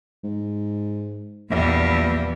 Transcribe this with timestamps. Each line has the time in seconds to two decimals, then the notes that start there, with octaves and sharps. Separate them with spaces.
0.23 G#2
1.50 A#1 E2 A#2 G3